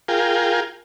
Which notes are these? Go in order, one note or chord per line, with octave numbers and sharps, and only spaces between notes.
F4 G#4 A#4 G5